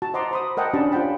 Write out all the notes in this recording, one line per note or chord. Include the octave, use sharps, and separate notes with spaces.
F#4 A5
C5 D#5 F#5 A#5 C6 D6
C5 B5 D#6
A#4 D#5 F#5 G5 A5
C#4 D4 F#4 G4 A5 B5
F4 C5 F#5 G5 B5